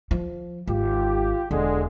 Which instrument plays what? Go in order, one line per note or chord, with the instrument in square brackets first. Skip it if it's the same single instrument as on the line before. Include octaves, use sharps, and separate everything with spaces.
[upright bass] F3
[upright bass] G#1 [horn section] F4 G4
[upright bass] E1 [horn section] D3 G#3